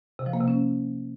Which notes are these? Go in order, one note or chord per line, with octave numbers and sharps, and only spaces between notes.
C3
F3
A#3
C3
C#4